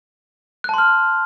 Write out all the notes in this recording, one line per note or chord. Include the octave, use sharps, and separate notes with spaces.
A5 C6 F6 F#6